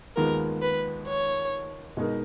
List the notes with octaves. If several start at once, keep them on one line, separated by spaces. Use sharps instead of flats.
D#2 D#3 G#3 B3 F4 A#4
B4
C#5
B2 G#3 D#4 A#4